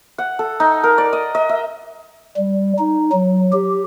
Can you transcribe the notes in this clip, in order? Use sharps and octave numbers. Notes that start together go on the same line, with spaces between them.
F#5
A4
D#4
A#4
D5
D#5
D#5
E5
G3
D#4
F#3
G4